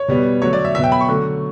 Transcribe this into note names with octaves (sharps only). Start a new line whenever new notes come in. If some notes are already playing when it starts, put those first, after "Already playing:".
Already playing: C#5
B2 G3 B3
D3 F#3 A3 C#5
D5
E5
B2 F#3 B3 E5
G5
B5
C#6
D3 F#3 A3